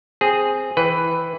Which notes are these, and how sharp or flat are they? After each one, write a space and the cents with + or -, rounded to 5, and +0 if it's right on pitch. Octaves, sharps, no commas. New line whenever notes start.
C4 +0 G#4 -5
E3 -5 B4 +10 G5 +0